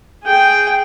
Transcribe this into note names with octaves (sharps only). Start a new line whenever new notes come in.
G#4 G5